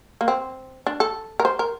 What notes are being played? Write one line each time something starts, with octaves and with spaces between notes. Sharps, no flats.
A#3
C4
D4
A4
A#4
C5
A#4